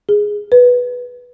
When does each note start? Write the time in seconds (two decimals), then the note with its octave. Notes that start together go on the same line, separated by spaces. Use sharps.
0.09 G#4
0.52 B4